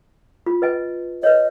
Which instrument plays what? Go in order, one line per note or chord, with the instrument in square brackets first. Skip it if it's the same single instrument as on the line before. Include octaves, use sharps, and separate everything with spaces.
[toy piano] F4
B4 D#5 G#5
[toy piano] B4 C#5 [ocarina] D#5